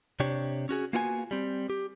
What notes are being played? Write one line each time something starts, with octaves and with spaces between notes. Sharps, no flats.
C3 D4 G4 C#5
C#4 F#4 G#4
A#3 B3 F4 F#4 F#5 G#5
G3 C4
G4